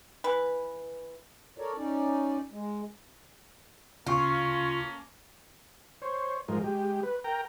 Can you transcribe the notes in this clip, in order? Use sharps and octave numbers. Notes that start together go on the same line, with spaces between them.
E3 B4
A4 A#4 C#5 D5
C#4 D#4 D5
G#3
D2 C#3 A3 A#3 C#4 F4 C#6
C5 C#5
G#2 F3 G#3 A#4
G#3 G4
B4
A#4 G5 A#5